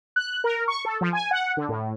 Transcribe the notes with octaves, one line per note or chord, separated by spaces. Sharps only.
F#6
A#4
C#6
A4
F3
G#5
F#5
D3
A2